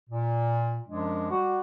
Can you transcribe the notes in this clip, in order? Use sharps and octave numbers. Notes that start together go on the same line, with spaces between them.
A#2
F#2 F3 G#3 D4
G3 F#4